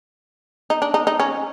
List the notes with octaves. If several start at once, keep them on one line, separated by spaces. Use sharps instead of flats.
D#4
D4
D#4
D#4
C#4